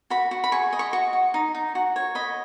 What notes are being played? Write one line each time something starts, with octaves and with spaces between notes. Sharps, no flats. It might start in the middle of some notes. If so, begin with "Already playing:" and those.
F#4 B5
F#4
B5
G#4 C#6
D#5
C#6
F#4 C#6
F#4
D#4
D#4
F#4
C#5
D#5 B5